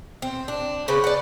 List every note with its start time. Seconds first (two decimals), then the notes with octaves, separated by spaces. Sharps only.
0.22 C4
0.48 D4
0.88 C#3 C4 C#4 B4
1.04 D5 F#5